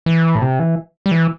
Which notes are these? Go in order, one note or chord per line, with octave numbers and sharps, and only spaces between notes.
E3
A2
C3
E3
G3
E3